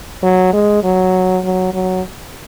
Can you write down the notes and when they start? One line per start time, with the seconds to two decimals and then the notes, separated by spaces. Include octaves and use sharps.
0.23 F#3
0.53 G#3
0.84 F#3
1.44 F#3
1.74 F#3